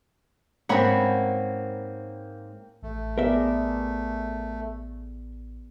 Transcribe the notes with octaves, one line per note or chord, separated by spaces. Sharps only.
G#2 A#3 C4 C#4 F#5 G#5 B5
A1 A3
B3 G#4 A#4 D5 E5